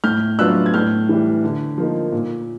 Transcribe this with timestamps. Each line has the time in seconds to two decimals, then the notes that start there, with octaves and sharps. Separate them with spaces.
0.04 A2 F6 G6
0.39 F#3 B3 D4 F4 E6 F#6
0.66 G#6
0.74 A2 F6 G6
1.09 E3 G3
1.44 D3
1.78 F3 A#3 D#4
2.12 A#2